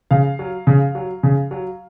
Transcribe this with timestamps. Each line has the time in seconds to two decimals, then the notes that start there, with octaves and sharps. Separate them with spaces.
0.11 C#3 F5
0.39 F#3
0.67 C#3
0.95 F#3
1.23 C#3
1.51 F#3